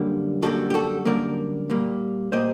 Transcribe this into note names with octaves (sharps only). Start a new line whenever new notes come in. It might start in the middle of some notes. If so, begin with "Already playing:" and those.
Already playing: F#2 D3 G3 A#3
F#2 D3 G3 A#3 F#4 A4
G4
F#4 A4
F#2 D3 G3 A#3 A#4 D5
A#2 G3 A#3
A#2 G3 A#3 C5 D#5